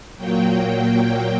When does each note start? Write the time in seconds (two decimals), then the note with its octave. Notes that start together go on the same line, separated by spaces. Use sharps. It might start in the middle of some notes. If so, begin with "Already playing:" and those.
0.17 A#2 F#3 A#3 G5
0.68 G5